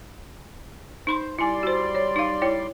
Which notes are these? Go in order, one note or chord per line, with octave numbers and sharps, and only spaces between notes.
D#4 C5 B5 C6
G3 E4 D5 G#5 C6
F#4 C5
C#5
D#4 F5
E4 C#5 G5